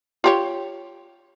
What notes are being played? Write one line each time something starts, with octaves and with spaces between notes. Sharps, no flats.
F4 G4 C#5